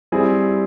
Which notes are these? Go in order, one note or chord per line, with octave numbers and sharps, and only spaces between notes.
G3 C4 E4 G#4